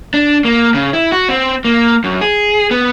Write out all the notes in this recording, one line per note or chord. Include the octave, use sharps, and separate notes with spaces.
D4
A#3
C#3
E4
F#4
C4
A#3
F#2
G#4
B3